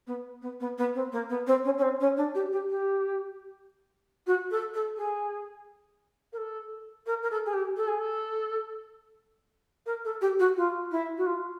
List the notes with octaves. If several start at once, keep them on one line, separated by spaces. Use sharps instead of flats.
B3
B3
B3
B3
C4
A#3
B3
C4
C#4
C#4
C4
C#4
D4
G4
G4
G4
F#4
A4
A4
G#4
A#4
A4
A#4
A#4
A4
G#4
G4
A4
G#4
A4
A#4
A4
G4
F#4
F4
E4
F#4
F4